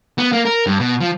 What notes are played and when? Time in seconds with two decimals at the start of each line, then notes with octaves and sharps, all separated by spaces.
0.18 B3
0.33 A#3
0.45 A#4
0.67 G2
0.79 B2
1.00 F3